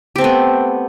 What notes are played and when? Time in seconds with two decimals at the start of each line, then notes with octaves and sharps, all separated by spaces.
0.16 G4
0.18 C4
0.21 A3
0.24 B3